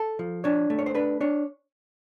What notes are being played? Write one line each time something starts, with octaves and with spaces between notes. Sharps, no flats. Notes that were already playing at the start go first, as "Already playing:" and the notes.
Already playing: A4
F3
D4 C#5
A3
C#5
C5
D4 B4
D4 C#5